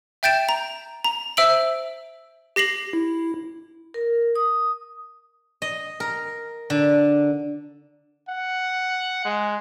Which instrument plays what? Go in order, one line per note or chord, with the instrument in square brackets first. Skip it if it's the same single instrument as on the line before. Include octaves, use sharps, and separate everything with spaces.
[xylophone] E5 G5 G6 A6 D7 E7
A#5
A#5
C5 E5 E6 D7 F#7
G4 A#6 C7 F#7
[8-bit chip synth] E4
[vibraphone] A#4
D#6
[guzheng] D#5
A#4
D3
[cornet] F#5
G#3